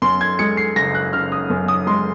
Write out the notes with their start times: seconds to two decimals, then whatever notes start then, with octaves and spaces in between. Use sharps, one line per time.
0.02 F#2 C6
0.21 G#6
0.39 G#3 C#7
0.57 C7
0.76 F#1 A#6
0.95 F#6
1.13 C#3 F6
1.32 D#6
1.50 F#2
1.68 D#6
1.87 G#3 C6